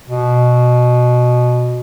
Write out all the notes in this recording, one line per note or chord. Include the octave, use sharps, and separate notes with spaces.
B2